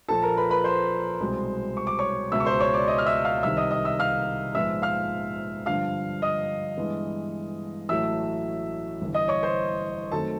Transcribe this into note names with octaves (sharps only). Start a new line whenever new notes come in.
A#1 A#2 F3 A4 A5
A#4 A#5
B4 B5
B4 B5
C5 C6
C2 B2 G#3 C4
C#6
D6
C#5 C#6
C#2 B2 G#3 B3 E5 E6
C#6
C5 C6
C#5 C#6
D5 D6
D#5 D#6
F6
E5 E6
F5 F6
C2 C3 D#3 E5 E6
D#5 D#6
D#5 D#6
E5 E6
F5 F6
A#1 G#2 F3 G#3 B3 E5 E6
F5 F6
G2 D3 F3 F5 F6
D#5 D#6
G2 E3 G#3 B3
A1 A2 F#3 A3 E5 E6
G1 G2 E3
D#5 D#6
C#5 C#6
C5 C6
F#2 D#3 F#3 A3 C4 A4 A5